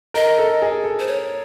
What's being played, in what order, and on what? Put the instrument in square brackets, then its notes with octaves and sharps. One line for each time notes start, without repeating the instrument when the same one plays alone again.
[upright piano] A#4 [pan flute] D#5
[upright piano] A4
G#4
A4
[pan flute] C5
C#5